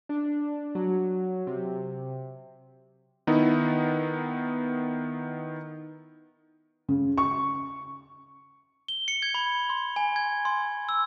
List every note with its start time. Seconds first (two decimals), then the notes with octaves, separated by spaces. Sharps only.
0.09 D4
0.75 F#3
1.47 C3
3.27 D#3 B3 D#4 E4
6.89 C#3
7.18 C#6
8.88 G7
9.08 C#7
9.22 G#6
9.34 B5
9.70 C6
9.96 G#5
10.16 G#6
10.45 C6
10.89 E6